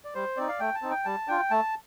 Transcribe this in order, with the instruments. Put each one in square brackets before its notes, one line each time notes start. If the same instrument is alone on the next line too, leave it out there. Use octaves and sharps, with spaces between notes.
[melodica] D5
G3 C5
C4 D#4 D5
F5
A3 G5
A5
C4 D#4
G5
G3 A5
D4 F4 G5
A3 A5